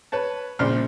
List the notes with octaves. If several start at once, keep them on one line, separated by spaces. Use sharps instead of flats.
B4 C#5 A5
A#1 C#3 C4 D5 C6 F6